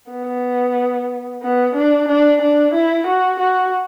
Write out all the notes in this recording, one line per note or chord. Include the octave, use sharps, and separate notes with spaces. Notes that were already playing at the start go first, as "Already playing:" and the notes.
B3
B3
D4
D4
D4
E4
F#4
F#4